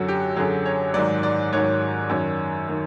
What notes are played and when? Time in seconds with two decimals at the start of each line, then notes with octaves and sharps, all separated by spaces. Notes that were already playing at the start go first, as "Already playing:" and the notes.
Already playing: F#2 D3 F#3 F#4
0.09 G4
0.36 F#2 D3 F#3 G#4
0.66 C#5
0.94 G#2 D#3 F#3 D5
1.23 D5
1.53 G#2 D#3 F#3 C#5
2.10 F#2 D#3 F#3
2.68 D#3 F#3